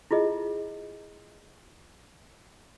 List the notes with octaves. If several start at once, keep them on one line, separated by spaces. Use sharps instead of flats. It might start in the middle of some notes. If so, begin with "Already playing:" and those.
E4 F4 G#4 D#5